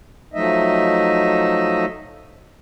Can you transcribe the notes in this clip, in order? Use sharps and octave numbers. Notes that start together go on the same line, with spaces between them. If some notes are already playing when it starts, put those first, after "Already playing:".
F3 F#3 A3 D#4 D#5 E5